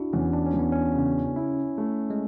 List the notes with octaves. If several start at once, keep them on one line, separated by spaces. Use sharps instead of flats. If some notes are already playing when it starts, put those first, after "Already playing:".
Already playing: D4 E4 F#4
E2 C#4
D4
C#4
E2
B3
C#4
C#3
E4
A3
G#3